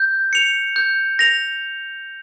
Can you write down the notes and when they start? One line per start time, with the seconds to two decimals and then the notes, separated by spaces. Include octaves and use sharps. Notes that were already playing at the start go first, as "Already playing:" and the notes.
Already playing: G6
0.33 C#7 F7
0.76 G6
1.19 A#6 F7